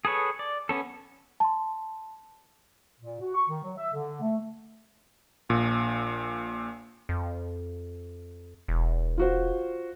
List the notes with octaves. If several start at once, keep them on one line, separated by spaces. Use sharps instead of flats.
G#4 A4 B4 C#5
D5
B3 C#4 A4
A5 C6
A#2
F#4
C#6
D#3
F#3
E5
D3
A3
A#1 A#2
F2
E1
F4 F#4 C5